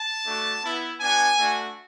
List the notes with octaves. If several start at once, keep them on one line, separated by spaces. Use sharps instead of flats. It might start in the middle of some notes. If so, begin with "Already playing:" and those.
Already playing: A5
A3 D4 F#4
B3 E4
B3 D4 F#4 G#5
A3 D4 F#4